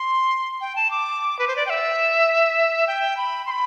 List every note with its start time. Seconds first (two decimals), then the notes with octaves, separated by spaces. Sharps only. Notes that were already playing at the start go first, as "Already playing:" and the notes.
Already playing: C6
0.61 G5
0.76 A5
0.90 D6
1.39 B4
1.48 C5
1.56 D5
1.66 G5
1.70 E5
2.87 G5
3.17 B5
3.46 C6
3.51 B5